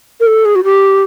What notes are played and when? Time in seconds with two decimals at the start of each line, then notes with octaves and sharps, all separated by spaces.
0.20 A#4
0.27 A4
0.45 G#4
0.55 F#4
0.64 G4